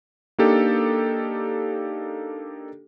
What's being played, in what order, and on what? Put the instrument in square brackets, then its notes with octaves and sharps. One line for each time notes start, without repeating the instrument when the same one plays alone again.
[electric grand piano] A#3 D4 D#4 G4 A4